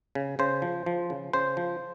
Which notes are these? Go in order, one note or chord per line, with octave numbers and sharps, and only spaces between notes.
C#3
C#3 C5
F3
F3
C#3
C#3 C5
F3